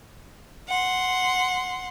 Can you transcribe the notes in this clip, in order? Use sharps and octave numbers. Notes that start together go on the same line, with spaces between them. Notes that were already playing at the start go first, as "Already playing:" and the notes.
F#5 C6